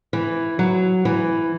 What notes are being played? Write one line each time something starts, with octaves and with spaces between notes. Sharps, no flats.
E3
F#3
E3